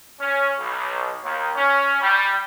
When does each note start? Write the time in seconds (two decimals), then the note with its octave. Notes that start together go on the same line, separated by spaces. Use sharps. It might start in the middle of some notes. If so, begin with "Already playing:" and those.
0.20 C#4
0.59 B1
1.23 D#2
1.55 C#4
2.01 G3